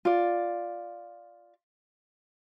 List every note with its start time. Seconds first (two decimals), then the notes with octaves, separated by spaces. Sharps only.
0.05 F4 D5